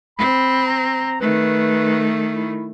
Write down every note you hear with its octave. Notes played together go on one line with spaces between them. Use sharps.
C4 B5
A#5
D#3 A3 B4
E4